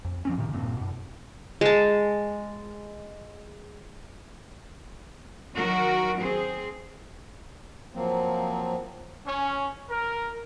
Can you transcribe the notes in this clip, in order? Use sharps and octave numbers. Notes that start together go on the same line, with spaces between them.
F2
F3 C4 C#4
A2 C3 D#3
E1 G2 A#2 C4
F#2 B2
G#3 A5
D#3 F#3 F#4 A#4
C4 G#4
F3 F#3 A#3 C4
C#4
A#4